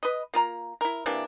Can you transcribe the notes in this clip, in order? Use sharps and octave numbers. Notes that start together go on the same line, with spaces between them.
B4 D#5
A#3 F4 A#5
E4 A#4
C3 E3 A#3 D4